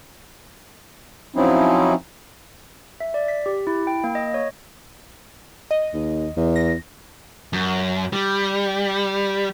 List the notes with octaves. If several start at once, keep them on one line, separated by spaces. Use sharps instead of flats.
F3 F#3 C4 C#4 D#4 E4
E5
D5
B6
G4
E4
G5
A#3
D#5
C#5
D#5
D#2
E2
A#6
F#2
G3